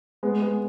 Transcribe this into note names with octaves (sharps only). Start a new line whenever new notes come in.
G#3 B3
G#3 B3